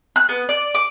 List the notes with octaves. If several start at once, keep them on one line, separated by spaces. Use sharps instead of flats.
F#6
B3
D5
D6